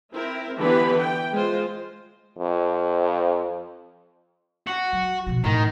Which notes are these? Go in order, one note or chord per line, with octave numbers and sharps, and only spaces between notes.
C4 E4 A#4
D3 E3 B3 G4 B4 B5
E4 G5
G#3 F4 C5
F2
F#4
F#3
B2 F3
A2 D#3